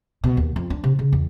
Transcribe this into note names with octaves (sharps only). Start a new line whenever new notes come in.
B2
D#2
F2
D4
C3
C#3
E2